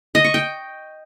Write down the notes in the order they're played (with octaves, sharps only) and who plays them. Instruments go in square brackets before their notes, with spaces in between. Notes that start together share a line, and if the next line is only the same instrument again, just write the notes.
[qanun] D#5
C#6
G5